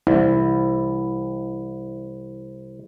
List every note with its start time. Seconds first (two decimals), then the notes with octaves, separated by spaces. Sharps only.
0.07 C2 E4